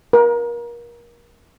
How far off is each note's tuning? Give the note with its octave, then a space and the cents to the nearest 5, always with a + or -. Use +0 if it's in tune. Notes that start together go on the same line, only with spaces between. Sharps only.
A#4 +30